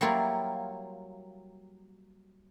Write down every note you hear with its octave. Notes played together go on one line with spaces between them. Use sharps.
F#3 G3 A#3 E4 F4